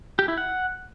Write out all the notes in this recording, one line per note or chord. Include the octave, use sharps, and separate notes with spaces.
G4
E4
F#5